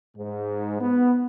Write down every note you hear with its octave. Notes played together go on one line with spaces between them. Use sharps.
G#2
B3